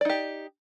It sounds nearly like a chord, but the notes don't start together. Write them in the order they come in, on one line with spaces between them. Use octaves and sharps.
D5 D#4 G4